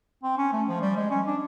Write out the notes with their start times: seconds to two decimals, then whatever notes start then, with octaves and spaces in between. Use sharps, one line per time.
0.23 C4
0.38 C#4
0.53 A3
0.68 F3
0.82 G3
0.97 G#3
1.11 C#4
1.27 D4